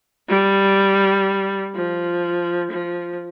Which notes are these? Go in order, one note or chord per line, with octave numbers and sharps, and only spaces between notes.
G3
F3
F3